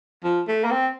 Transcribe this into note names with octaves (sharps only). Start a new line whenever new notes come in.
F3
A3
A#3
C4